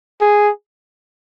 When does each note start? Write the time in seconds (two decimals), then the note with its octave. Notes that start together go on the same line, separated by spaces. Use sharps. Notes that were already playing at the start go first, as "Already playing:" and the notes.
0.21 G#4